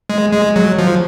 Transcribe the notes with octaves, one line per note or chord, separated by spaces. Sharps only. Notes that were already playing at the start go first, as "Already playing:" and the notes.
G#3
G#3
F#3
F3